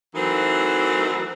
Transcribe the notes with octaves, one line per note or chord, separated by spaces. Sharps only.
E3 F#3 A3 C4 D#4 A#4